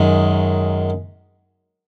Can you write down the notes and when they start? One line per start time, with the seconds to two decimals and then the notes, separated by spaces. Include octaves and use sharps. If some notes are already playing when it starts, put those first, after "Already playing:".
Already playing: F#2 D#3 G#3